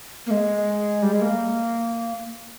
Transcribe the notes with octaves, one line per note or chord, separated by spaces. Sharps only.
A#3
G#3
G3
G#3
A#3